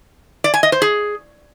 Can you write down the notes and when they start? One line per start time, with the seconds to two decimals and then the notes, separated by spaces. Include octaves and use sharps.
0.44 D5
0.54 G#5
0.63 D#5
0.72 C5
0.82 G#4